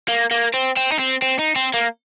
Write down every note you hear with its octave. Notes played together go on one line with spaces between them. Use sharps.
A#3
A#3
C4
C4
D#4
C4
C4
D#4
C4
A#3